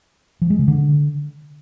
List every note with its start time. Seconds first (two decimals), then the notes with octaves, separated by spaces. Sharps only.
0.42 F3
0.50 G#3
0.59 C#3
0.68 D3